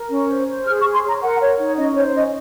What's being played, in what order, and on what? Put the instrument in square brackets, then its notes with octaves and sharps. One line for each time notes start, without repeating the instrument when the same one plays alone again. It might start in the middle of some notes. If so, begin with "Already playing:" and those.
Already playing: [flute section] A#4
C#4
C5
C5
G#4 F6
C#6
G#4
C6
C#5 A#5
A#4 F#5
C#5
D#4
C#4 D#5
C5 C#5
C#4 D#5